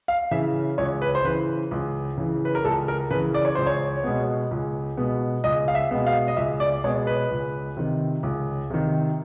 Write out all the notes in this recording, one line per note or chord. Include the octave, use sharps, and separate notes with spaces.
F5
C#3 E3 E5
C#2 C#5
B4
C5
C#3 E3 B4
C#2
C#3 E3
B4
A#4
C#2 A4
A#4
C#3 E3 B4
D5
C#5
C#2 C5
C#5
B2 G#3 B3
C#2
B2 G#3 B3
C#2 D#5
F5
E5
B2 G#3 B3
F5
D#5
C#2 E5
D5
B2 G#3 B3 C#5
B4
C#2
C3 D#3
C#2
C3 D#3